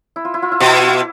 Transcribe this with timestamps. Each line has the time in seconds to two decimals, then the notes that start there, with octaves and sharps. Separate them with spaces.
0.16 E4
0.25 F4
0.34 E4
0.42 F4
0.52 E4
0.60 B2 F4
0.69 E4
0.78 F4
0.88 E4